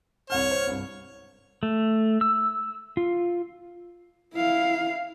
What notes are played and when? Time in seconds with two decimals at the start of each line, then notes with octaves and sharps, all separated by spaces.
0.30 C2 C#5 F#5 F6
0.51 C5
0.67 C2 G2
1.63 A3
2.21 E6
2.97 F4
4.34 E4 F5